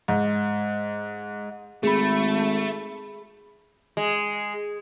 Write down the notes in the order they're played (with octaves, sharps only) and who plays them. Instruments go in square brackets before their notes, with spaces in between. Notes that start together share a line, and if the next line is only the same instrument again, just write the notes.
[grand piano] G#2
[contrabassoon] G#1 [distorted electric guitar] A3 [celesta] G#4 B5
[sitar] G#3